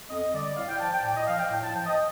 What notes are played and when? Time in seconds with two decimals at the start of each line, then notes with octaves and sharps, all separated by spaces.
0.10 F2 D#5
0.33 D3 G3 D5
0.57 A2 F5
0.69 G5
0.80 F3 A5
0.93 G5
1.04 A2 D5
1.16 D#5
1.27 F3 F5
1.39 G5
1.51 A2
1.63 A5
1.75 F3 G5
1.86 D#5